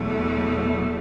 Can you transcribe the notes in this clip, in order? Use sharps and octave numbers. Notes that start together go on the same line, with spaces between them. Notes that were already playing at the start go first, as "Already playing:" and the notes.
Already playing: E2 B2 F#3 A3